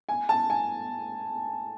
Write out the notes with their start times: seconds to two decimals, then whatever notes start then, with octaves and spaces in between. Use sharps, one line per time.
0.09 G#5
0.29 A5
0.50 G#5